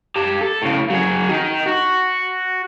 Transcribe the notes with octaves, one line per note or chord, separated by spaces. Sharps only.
G4 A5
A4
A2 C#3
F#3 G#4
D#3 D#4
F#4